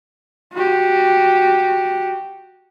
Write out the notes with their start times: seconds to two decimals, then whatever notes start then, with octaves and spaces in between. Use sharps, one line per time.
0.54 F#4 G4